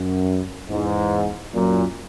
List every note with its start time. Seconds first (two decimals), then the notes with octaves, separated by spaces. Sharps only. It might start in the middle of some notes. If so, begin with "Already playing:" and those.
Already playing: F#2
0.69 E2 G#2
1.54 F#2 A#2